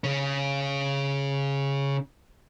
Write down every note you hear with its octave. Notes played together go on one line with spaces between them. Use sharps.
C#3 C#4